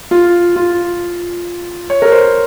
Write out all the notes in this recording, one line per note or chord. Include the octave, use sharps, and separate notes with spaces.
F4
F4
C#5
A#4
C5